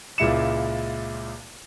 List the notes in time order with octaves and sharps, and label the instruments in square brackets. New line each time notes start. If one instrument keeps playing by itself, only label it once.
[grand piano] C#2 A#2 G#3 E4 C#7 E7